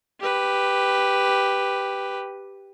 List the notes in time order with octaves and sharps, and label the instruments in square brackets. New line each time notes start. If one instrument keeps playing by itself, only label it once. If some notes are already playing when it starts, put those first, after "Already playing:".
[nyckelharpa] G4 B4